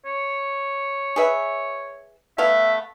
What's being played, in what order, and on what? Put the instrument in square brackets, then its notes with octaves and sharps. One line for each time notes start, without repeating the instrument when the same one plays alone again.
[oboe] C#5
[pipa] G#4 B4 E5
[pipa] A3 B3 F5 [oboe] E5